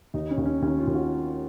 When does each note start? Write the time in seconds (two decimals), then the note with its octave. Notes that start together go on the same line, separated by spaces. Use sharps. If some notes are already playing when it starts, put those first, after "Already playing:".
0.14 D#2 D#4
0.31 C#4
0.37 D#2
0.46 C#4
0.62 D#2 C#4
0.79 F4
0.87 D#2
0.95 F#4